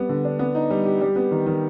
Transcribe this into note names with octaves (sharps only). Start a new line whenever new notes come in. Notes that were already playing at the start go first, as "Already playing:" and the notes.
Already playing: G3 B3
D3
D4
B3
D#4
G3
G4
G3
B3
D#3
D#3